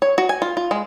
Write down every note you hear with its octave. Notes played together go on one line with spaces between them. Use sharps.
C#5
F#4
G#5
F4
F4
G#3